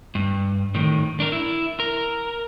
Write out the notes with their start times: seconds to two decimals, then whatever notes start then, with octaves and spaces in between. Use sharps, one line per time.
0.15 G2
0.75 A2 D#3
1.20 D4 A#4
1.32 E4
1.80 A#4